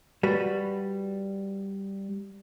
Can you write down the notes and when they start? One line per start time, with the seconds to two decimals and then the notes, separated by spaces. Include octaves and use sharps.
0.23 G3 F#4 B4